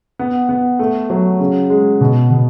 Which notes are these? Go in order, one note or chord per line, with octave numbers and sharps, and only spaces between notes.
B3
B3
A3
F#3
C#3
G#3
B2
B2